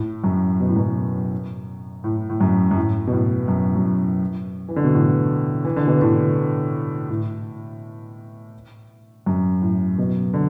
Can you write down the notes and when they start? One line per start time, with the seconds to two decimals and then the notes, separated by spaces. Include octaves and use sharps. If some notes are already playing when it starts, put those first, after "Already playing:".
Already playing: A2
0.24 F#2
0.60 B2
0.68 A2
0.76 F#2 B2
2.04 A2
2.30 A2
2.41 F#2
2.71 F#2
2.76 A2
3.07 B2
3.12 A2
3.48 F#2
3.76 F#2
4.68 E3
4.76 D3
4.84 B2
4.93 A2
5.64 E3
5.76 D3
5.87 B2 E3
6.01 A2 D3
7.09 A2
9.26 F#2
9.62 A2
9.98 F#2 B2
10.34 D3